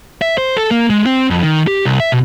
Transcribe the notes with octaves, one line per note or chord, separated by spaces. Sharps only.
E5
C5
A4
A#3
G#3
C4
F2
D#3
G4
C2
E5
B2